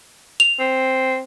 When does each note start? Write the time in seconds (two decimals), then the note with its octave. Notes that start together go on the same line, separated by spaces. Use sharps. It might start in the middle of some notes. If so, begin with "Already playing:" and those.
0.40 F7
0.59 C4